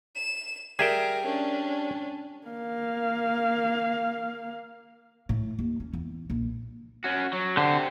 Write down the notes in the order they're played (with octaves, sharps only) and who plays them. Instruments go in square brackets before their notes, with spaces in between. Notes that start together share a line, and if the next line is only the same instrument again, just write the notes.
[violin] E7
[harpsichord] G3 [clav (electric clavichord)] G#4 E5 G5 [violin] A#4
[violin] C#4 D4
[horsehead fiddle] A#3 F5
[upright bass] A2
D#2
C#4
E2
A#1
[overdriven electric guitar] C#4 F#4
F#3
[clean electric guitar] D3 [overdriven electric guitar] G4 C5